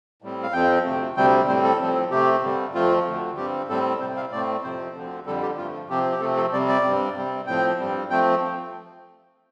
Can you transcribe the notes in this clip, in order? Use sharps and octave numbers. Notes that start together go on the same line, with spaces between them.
A2 G3 C4
F5
F2 F3 C4 G5
D2 C3 A3 C4
D2 C3 G3 C4 G5
A2 G3 C4 C5
A4
A2 F3 C4
C3 A3 C4 G4
G2 D3 G3 C4
F2 F3 A3 C4 F4
D2 D3 A3
G2 G3 C4 G4
A2 G3 C4 A4
C3 G3 C4 C5
F5
A2 A3 C4 D5
F2 C3 F3 C4 C5
D2 D3 F3 C4
F2 D3 G3 A4
G4
G2 F3 A3 F4
C3 F3 C4 G4
G4
C3 F3 A3 C4 A4
A4
C3 G3 C4 D5
D5
G2 G3 C4
C3 G3 C4
A2 F3 C4 G5
G2 G3 C4
F3 A3 C4 G5